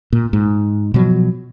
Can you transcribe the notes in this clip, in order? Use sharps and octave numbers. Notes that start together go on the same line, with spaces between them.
A#2
G#2
B2 F3 F#3